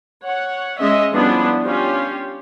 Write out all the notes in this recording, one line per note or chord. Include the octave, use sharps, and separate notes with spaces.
C#5 F#5
G#3 C#4 D#5 E5
F3 G3 B3 C#4 D4 E4
C#4 F4 G4